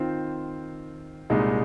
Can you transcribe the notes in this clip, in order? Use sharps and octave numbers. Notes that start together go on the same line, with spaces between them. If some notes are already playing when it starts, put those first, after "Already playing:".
Already playing: D#3 C4 F4 C5
C2 A#2 G#3 D#4